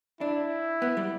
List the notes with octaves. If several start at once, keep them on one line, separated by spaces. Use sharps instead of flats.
D4 E4
B3
G3